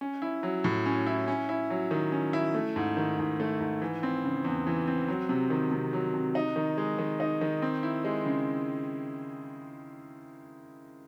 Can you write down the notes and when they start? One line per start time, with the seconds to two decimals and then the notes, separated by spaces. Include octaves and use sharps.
0.01 C#4
0.22 E4
0.43 F#3
0.64 A2
0.86 C#4
1.07 E4
1.28 C#4
1.49 E4
1.70 F#3
1.91 D#3
2.12 C#4
2.33 E4
2.55 A3
2.76 G#2
2.97 D#3
3.19 G#2
3.40 A3
3.60 G#2
3.82 E3
4.03 C4
4.24 C#3
4.44 E2
4.67 E3
4.87 C4
5.08 F#3
5.29 C3
5.50 D#3
5.71 C3
5.93 F#3
6.14 C3
6.35 D#4
6.56 D#3
6.78 G#3
6.98 D#3
7.20 D#4
7.41 D#3
7.62 C4
7.83 E4
8.04 G#3
8.25 C#3